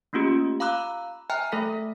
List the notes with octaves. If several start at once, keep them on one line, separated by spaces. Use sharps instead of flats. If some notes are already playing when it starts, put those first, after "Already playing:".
A3 A#3 C#4 F4 G4
F5 A#5 B5 D6 E6 F#6
E5 G5 G#5 A#5 F6 F#6
A3 A4 E5 B6